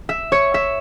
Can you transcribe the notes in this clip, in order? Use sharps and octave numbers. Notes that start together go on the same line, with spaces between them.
E5
C#5
E5